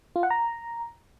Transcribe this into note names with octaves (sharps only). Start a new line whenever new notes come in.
F4
F#5
A#5